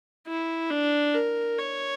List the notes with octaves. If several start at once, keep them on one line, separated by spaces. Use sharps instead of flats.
E4
D4
A#4
C#5